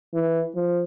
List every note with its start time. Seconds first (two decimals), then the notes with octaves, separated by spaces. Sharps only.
0.14 E3
0.55 F3